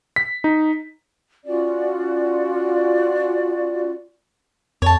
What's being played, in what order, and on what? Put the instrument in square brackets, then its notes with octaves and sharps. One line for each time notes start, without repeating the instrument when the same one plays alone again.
[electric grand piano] B6
D#4
[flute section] C#4 F4 F#4 D5
[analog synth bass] F2 [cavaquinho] C#5 A5